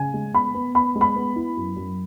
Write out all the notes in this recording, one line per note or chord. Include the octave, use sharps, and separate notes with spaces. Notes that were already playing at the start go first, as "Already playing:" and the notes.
Already playing: C#3 G#5
G#3
B3 B5
B3
B3 B5
G#3
B5
B3
E4
F#2
F#2